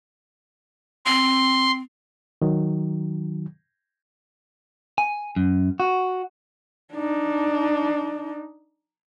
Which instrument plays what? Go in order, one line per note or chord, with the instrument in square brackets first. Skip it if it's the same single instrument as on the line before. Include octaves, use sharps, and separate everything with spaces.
[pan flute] C4 [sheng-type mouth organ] C6
[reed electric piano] D#3 F#3
[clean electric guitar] G#5
F#2
F#4
[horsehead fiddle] D4 D#4